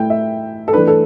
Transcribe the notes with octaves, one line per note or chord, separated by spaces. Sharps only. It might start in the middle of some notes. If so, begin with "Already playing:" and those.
Already playing: A2 A3 E4 G5
E5
A4
E3 A3 D4 B4
A4